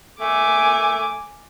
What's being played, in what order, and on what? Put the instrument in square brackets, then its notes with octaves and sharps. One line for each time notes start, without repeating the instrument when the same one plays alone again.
[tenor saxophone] A3 [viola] G#5 D6